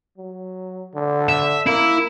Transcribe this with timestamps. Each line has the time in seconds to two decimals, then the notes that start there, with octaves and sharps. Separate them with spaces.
0.18 F#3
0.95 D3
1.29 E5
1.66 A#3 E4